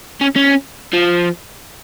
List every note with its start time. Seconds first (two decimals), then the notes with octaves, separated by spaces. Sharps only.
0.21 C#4
0.36 C#4
0.93 F3